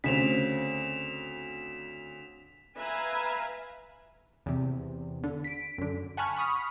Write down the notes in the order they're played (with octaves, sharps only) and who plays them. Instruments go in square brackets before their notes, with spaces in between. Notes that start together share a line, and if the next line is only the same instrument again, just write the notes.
[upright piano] D2 C#3 C4 [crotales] B6 E7 F7
[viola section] B4 E5 F5 G#5 A#5
[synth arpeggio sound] E2 C3
D3
B6 D7
F#2 D3
F#5 G#5 A5 B5 C#6 F6
B5 C#6 D#6 F6 B6